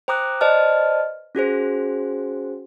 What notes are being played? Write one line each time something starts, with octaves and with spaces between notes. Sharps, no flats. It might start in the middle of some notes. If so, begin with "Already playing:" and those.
C5 G5 A#5 D6 D#6 F#6
B4 C5 D5 D#5 A5 F6
C#4 F#4 G#4 C5